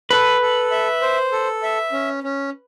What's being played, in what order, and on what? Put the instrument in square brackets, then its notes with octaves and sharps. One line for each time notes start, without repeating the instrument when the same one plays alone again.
[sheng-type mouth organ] A4 [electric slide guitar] B4
[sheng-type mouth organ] A4
E5
C5
A4
E5
C#4
C#4